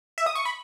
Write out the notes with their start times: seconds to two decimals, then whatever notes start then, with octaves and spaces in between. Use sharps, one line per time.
0.18 E5
0.26 D#6
0.35 C#6
0.45 B5